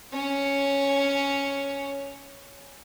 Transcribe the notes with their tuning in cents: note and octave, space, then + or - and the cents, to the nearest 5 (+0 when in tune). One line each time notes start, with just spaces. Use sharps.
C#4 +5 C#5 +0